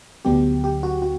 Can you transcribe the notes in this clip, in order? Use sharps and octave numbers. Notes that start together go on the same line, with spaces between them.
D2 D3 F#3 B3 D4 G4
G4
F#4
F#4